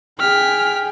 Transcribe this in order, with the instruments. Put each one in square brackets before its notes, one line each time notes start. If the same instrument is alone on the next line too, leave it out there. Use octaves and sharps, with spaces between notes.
[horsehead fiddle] G#4 G5 [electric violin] F6 B6